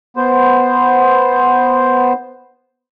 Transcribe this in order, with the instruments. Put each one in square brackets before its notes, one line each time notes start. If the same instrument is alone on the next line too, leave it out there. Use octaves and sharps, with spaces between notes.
[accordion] B3 C5